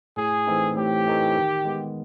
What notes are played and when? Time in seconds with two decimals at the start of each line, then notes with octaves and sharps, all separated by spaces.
0.17 A2 G#4
0.47 E3 A3 C4 D#4
0.76 A2 G4
1.06 E3 A3 C4 D#4
1.36 D#3
1.65 G#3 B3